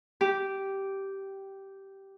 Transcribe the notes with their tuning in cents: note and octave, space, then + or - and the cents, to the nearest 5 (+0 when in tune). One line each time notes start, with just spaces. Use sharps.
G4 -10